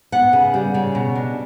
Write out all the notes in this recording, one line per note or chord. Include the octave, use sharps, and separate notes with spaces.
B3 F#5
C#3
G3
C#3
B2
D4